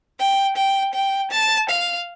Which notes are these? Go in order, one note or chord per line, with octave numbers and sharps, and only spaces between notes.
G5
G5
G5
A5
F5